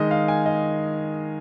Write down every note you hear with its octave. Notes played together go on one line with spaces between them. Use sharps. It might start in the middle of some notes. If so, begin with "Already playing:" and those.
Already playing: D#3 G#3 D#5
F5
G#5
D#5